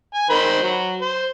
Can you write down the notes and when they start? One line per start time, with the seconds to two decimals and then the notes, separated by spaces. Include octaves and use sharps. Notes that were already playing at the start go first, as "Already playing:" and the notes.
0.15 G#5
0.30 D#3 C5 B5
0.63 F#3
1.02 C5